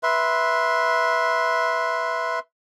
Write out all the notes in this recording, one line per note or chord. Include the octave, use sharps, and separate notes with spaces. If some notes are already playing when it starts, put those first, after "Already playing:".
B4 E5 C6